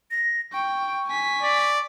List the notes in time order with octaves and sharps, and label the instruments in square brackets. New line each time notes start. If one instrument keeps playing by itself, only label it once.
[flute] A#6
[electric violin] G5 [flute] C#6
[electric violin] G#5 B6
[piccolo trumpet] D5